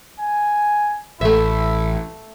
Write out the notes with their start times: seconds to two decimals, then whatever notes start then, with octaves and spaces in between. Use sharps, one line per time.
0.20 G#5
1.21 A1 A3 E4 E5